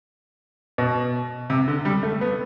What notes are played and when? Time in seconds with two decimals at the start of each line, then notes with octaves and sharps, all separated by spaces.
0.78 B2
1.50 C3
1.68 D3
1.85 G3
2.03 A3
2.21 B3